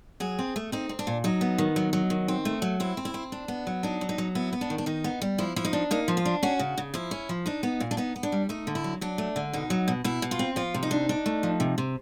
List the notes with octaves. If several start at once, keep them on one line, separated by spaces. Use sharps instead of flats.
F#3 G#4
C4
A3
C4 D#4
C4
D4
A#2
F#3 D#4
B3
D#3
F#3
F#3
D#3
C4
A3
F#3
C4 E4
C4
E4
C4
D4
B3
F#3
D4 D#4
F#3
D#4
F#3
B3 E4
B3
D4
D#3
D4
D#3 D#4
B3
G3
F3 E4
F3 E4
D#4
D4
A#3 D#4
F3
F4
D4
C#4 F#4
C#3
C#3
F3 E4
C#4
F3
D4 D#4
B3
A#2
D4
B3 D#4
B3
D4
G3
A3 D#4
D3
E4
F#3
F#3 D4
A3
D3
B2 D#4
F#3
B2
B2 E4
B2
F4
C4
F3 F4
C3
D#4
D4
D4
A3
F3
C3
C3